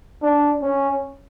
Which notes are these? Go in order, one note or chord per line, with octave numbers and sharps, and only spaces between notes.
D4
C#4